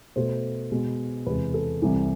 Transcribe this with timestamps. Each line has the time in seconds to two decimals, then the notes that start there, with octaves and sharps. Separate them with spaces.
0.16 B2 A3 C5
0.72 B2 G#3 B3
1.26 E2 C3 G#3 B4
1.54 A4
1.82 C2 C3 E3